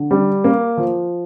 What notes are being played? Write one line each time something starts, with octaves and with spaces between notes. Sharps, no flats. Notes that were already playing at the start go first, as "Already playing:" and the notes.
Already playing: D3
G3
A#3
F3